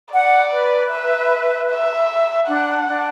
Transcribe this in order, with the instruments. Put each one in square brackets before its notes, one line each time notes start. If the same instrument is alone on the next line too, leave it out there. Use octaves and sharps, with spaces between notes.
[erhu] D5 [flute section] F#5
[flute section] B4
[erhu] E5
E5
[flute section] D4 [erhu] F#5
[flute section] D4